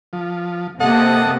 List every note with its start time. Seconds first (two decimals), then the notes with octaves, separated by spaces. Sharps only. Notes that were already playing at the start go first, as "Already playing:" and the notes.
0.13 F3
0.80 C3 A#3 A4 D#5 F#5